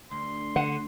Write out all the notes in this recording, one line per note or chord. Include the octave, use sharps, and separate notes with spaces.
D2 C6
D3 F#5